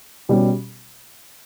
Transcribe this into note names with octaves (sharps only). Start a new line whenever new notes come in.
B2 G3 C#4 G4